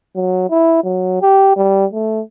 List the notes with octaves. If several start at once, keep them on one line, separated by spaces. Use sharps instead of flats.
F#3
E4
F#3
G4
G3
A3